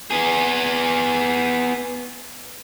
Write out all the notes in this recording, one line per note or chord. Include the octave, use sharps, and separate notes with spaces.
B3 G#4